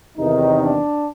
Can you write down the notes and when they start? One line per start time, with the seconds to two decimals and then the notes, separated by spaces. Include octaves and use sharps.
0.18 E2 C3 D#3 D#4
0.61 D4